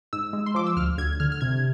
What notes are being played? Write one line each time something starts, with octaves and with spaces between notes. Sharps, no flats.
G#2 E6
G#3
C6
F3 D6
E6
D2 F6
D2 G#6
D3 F6
F6
C3 G#6